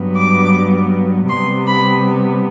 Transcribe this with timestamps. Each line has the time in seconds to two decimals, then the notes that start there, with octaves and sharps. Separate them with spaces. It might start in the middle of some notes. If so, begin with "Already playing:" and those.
Already playing: G2 F#3 B3
0.16 D6
1.29 C3 G3 B3 C6
1.67 B5